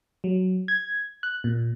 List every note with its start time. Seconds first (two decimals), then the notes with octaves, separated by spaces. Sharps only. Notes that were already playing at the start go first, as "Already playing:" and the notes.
0.24 F#3
0.68 G#6
1.23 F#6
1.44 A#2